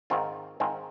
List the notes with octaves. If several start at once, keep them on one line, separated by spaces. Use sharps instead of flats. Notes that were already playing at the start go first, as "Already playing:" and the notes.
G#2 D#3 G#3 C4 F4
G#2 D#3 G#3 C4 F4